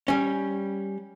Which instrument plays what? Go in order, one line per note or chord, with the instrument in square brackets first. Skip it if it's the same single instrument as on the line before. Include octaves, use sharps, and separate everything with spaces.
[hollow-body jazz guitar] G3 C#4